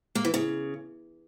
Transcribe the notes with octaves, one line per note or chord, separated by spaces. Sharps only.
A#3
E3
C#3